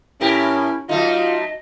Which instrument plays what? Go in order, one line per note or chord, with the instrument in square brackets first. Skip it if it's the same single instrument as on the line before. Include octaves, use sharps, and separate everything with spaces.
[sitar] A2 G4 A#4 [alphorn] C#4 [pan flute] E4
[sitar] F#3 A3 D#4 [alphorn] F4 [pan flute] D#5